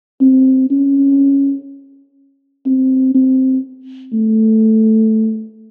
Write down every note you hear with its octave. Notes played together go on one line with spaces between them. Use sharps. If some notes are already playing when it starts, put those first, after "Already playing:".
C4
C#4
C4
C4
A3